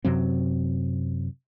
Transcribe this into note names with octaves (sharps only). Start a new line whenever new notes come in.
F#2 C3 F#3 C4